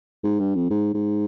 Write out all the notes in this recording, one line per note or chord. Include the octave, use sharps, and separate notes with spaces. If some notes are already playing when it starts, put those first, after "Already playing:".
G#2
G2
F2
G#2
G#2